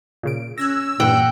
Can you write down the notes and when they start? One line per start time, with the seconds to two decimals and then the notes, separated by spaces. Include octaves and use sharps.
0.23 A#2 C#3 D7
0.58 C#4 E6 F#6 G#6 A#6
1.00 G2 A#2 E3 F#5 G5